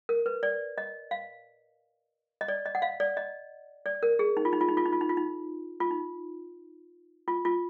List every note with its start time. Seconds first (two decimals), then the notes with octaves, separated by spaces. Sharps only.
0.09 A#4
0.26 B4
0.43 D5
0.78 D#5
1.11 F5
2.41 D#5
2.48 D5
2.66 D#5
2.75 F#5
2.82 F5
3.00 D5
3.17 D#5
3.86 D5
4.03 A#4
4.19 G#4
4.37 D#4
4.45 F4
4.53 D#4
4.61 F4
4.69 D#4
4.77 F4
4.85 D#4
4.93 F4
5.01 D#4
5.09 F4
5.17 D#4
5.80 F4
5.91 D#4
7.28 F4
7.45 F4